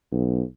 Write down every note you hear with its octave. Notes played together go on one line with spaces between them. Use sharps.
B1